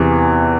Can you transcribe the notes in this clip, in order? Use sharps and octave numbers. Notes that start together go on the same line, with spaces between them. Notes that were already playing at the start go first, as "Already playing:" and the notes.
Already playing: E2 C3 E3